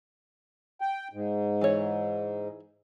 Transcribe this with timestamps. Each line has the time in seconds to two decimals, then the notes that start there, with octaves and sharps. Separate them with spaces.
0.81 G5
1.13 G#2
1.61 E3 C#5